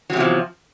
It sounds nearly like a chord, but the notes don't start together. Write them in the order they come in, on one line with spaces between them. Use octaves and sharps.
F#3 C3 E2 F3